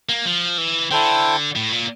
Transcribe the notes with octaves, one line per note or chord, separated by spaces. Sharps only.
A#3
F3
E3
D3 E4 A4 C5 G5
A2
A#2